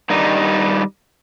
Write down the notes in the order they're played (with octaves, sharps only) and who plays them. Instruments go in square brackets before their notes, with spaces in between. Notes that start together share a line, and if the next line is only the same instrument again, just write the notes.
[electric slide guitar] G2 D#3 G3 D#4